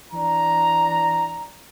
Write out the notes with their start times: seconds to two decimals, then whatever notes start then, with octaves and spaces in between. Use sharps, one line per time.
0.13 E3 D4 A#5